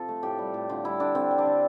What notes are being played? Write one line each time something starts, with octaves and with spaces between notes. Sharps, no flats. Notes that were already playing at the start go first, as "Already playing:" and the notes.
Already playing: C3 F3 A4
A3
A2 G4
G3
A2
D3 F4
G3 E4
D3 D4
D3 C4
G3
D4
D3